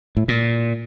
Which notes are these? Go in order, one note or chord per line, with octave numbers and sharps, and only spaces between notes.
A2
A#2